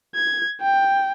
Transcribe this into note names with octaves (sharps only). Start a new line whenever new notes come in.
G#6
G5